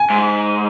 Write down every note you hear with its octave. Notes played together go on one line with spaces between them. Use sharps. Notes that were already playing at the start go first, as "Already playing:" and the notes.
Already playing: G#5
G#2